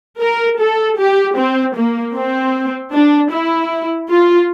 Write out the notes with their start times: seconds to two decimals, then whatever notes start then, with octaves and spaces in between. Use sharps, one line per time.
0.20 A#4
0.59 A4
0.98 G4
1.36 C4
1.75 A#3
2.14 C4
2.92 D4
3.30 E4
4.08 F4